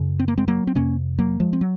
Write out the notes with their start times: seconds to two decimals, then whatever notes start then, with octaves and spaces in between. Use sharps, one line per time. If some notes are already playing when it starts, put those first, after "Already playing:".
Already playing: F#2 C#3
0.19 C4
0.28 A#3
0.38 G#3 C4
0.48 F#3 A#3
0.67 C4
0.75 F2 C3 A#3 C#4
1.19 F#3 A#3
1.40 F3 G#3
1.53 C4
1.61 F#3